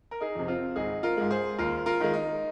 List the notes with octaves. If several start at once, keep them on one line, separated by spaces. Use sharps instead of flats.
A#4
D#4 G#4
F2 C3
C4 F4
G#1 D#4 G#4
F4 A#4
G#2 G#3
G#4 C5
D#2 F4 A#4
F4 A#4
D#3 G#3
D#4